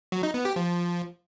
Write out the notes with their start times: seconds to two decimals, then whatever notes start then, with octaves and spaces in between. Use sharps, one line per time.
0.12 F#3
0.23 D#4
0.34 B3
0.45 G4
0.56 F3